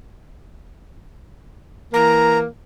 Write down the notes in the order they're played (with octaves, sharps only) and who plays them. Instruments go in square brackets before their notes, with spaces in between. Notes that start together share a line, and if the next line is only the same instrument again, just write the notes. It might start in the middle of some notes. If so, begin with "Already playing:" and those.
[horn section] E3 A#3 [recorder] A#5